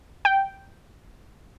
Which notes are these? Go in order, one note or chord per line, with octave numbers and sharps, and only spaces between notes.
G5